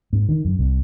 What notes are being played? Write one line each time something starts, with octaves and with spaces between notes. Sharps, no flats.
G#2
D#3
F#2
C2